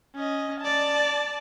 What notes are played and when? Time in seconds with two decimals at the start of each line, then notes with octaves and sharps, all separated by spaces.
0.16 C#4 D#5
0.61 D5 A5